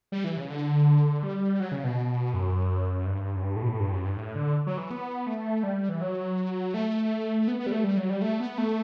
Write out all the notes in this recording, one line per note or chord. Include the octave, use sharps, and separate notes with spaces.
G3
E3
C#3
D3
G3
F#3
C#3
B2
F#2
G2
F#2
G2
A2
B2
A2
G2
F#2
G2
A2
D3
F#3
E3
B3
A3
G3
E3
F#3
A3
B3
B3
G3
A3
G3
F#3
G3
A3
B3
A3